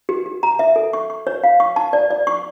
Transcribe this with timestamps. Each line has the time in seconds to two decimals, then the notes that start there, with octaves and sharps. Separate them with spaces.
0.09 G4
0.26 G4
0.43 A#5
0.59 E5
0.76 A4
0.93 C#6
1.10 C#6
1.27 C#5
1.43 F5
1.60 C#6
1.76 A5
1.93 D5
2.11 D5
2.27 C#6